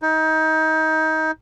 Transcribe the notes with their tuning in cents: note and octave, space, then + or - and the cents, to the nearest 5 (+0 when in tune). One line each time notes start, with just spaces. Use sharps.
D#4 +25